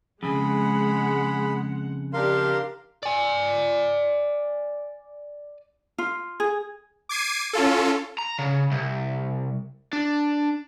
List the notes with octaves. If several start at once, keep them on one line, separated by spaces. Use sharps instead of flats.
F2 C#3 G#3 G#4 F#5 B5
D4 D#4 G4 A#4 F5 C6
D5 G#5
F4
G#4
D6 G#6 C7 D#7
C#4 F4 A4
A#5
C#3
C2
D4